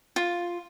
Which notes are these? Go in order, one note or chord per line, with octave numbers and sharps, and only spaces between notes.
F4